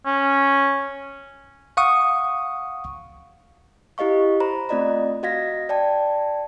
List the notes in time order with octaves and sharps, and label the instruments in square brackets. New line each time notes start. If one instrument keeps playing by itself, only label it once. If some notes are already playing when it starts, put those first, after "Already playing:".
[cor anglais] C#4
[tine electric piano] F5 F#5 C#6 D#6
[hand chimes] E4 G4 D#5 F5 C#6
C5 A#5 B5
A3 C4 F4 D5 D#5 A#5
F#4 D#5 F5 G#6 A#6 B6
D5 G5 A5